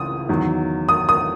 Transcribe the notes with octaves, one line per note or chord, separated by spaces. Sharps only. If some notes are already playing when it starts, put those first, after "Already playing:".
Already playing: C#2 C#3 E3 D#6
E2 D#3 F#3
D#6
D#6